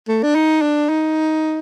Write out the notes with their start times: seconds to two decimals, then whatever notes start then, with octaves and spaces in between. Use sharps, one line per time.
0.08 A3
0.23 D4
0.35 D#4
0.61 D4
0.89 D#4